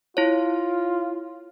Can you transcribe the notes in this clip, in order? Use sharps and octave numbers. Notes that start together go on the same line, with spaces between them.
E4 F4 C#5